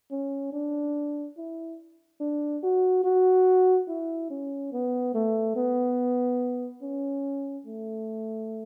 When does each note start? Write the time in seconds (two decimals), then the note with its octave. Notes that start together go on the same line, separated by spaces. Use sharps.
0.11 C#4
0.53 D4
1.37 E4
2.20 D4
2.63 F#4
3.04 F#4
3.88 E4
4.30 C#4
4.73 B3
5.14 A3
5.56 B3
6.82 C#4
7.66 A3